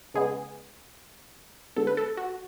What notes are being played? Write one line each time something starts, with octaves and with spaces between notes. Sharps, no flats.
C#3 G#3 B3 G#4
D3 G#3 B3 A4
B4
A4
F#4